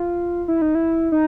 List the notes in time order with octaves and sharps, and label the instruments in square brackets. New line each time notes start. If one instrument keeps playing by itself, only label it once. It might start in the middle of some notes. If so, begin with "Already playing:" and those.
Already playing: [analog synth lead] F4
E4
D#4
E4
D#4